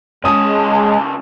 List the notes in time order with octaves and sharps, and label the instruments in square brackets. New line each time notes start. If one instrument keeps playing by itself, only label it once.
[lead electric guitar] C#2 A5 [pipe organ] G#3 [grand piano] C#4 D#6